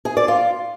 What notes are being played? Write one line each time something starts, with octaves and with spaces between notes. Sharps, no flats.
G#4
D5
F4